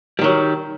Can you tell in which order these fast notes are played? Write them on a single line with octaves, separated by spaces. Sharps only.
G3 D#3 F#3